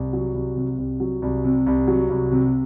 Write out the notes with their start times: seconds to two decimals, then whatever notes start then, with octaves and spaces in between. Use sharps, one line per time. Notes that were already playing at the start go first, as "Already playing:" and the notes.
Already playing: C2
0.13 F#3
0.34 C2
0.56 C3
0.78 C2
1.00 F#3
1.22 C2
1.44 C3
1.66 C2
1.88 F#3
2.10 C2
2.32 C3